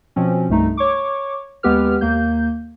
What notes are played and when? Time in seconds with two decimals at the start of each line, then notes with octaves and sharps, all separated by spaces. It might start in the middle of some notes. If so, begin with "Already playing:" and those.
0.16 B2 F3 C4 C#4
0.49 C2 G2 A3 D#4
0.77 C#5 C#6 D6
1.63 D#2 G#3 B3 G4 B4 F6
2.01 D#2 A#3 G6